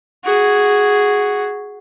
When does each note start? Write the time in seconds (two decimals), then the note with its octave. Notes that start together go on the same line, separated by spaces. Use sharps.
0.25 F#4 G#4